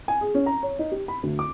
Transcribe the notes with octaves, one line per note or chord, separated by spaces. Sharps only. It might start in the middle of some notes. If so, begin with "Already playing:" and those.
G#5
G#4
C#4
A#5
C#5
D#4
G4
B5
D2
D6